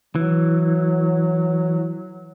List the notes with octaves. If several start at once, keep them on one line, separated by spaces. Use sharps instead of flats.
E3 F#3